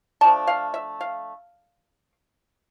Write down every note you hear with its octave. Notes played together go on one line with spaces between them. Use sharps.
F3 A3 D4 A5
F5
E5
F5